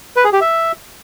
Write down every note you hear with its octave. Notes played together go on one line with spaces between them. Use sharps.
B4
G#4
G4
E5